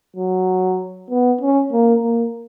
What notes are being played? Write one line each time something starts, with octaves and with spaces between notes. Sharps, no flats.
F#3
B3
C#4
A#3
A#3